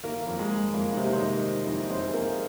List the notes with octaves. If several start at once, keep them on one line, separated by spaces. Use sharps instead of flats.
D#3 A#3 A#4
F2
G#3
D#3
F2 A#3
D#4
C3 D#3 C4
C5
D#3 D#4 D#5
D#3
F2 D#4 D#5
F2 C4 C5
G#4
F2 A#3 A#4